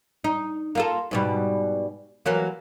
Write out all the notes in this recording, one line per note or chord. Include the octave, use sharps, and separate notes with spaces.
D#4
A#3 F4 A4
G#2 B2 G3
E3 F#3 A#3